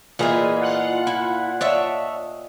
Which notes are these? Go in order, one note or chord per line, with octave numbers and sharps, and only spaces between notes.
A#2 E3 F4 G#4 D#5 E5
F4 F#5
E4
D4 C#5 D#5 E5